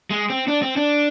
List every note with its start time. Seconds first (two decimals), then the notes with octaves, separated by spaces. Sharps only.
0.10 G#3
0.30 C4
0.48 D4
0.62 C4
0.77 D4